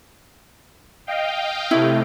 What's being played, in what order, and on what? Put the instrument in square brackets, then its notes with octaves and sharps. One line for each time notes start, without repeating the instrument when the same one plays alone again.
[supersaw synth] D#5 F5 G5
[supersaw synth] C3 A3 [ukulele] E4